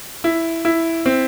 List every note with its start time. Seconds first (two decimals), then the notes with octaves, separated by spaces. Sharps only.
0.24 E4
0.65 E4
1.06 C4